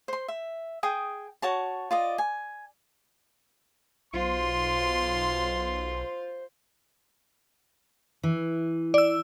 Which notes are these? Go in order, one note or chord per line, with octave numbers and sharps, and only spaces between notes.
C5 C6
E5
G#4 G5 D#6
F#4 C#5 A5
F4 D5 D#5
G#5
B1 F4 C5 C6
E3
D5 E6